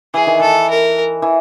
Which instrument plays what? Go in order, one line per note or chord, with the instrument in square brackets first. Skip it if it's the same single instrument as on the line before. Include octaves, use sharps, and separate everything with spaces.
[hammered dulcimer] E3 [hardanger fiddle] G#4
[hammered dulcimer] D#3
[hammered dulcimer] E3 [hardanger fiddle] A4
[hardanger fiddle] A#4
[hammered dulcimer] E3